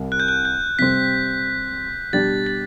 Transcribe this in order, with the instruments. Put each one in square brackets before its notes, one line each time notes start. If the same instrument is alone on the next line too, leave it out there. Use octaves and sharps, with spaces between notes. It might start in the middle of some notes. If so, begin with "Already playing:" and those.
Already playing: [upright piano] C2 C3 G3
[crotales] F#6
G6
F#6
G6
[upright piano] C3 G3 C4 [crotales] B6
[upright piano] B2 G3 D4 G4 [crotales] A6
[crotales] A6